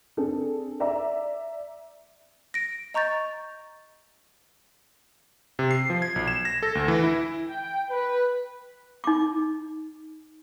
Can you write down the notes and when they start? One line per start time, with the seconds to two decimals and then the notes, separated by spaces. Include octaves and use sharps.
0.17 C4 D4 G#4 A4
0.80 D5 E5 A#5
2.54 A#6 D7
2.94 D#5 A#5 C#6 G6 A6
5.59 C3
5.71 C7
5.90 F3
6.02 G#6
6.16 B1
6.28 E7
6.45 A#6
6.63 A4
6.75 D2
6.88 E3
7.04 E4
7.47 G5
7.90 B4
9.04 D#4 D6